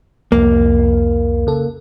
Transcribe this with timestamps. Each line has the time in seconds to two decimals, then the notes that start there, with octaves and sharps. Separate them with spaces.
0.32 C2 F2 A#3
1.47 C#3 A4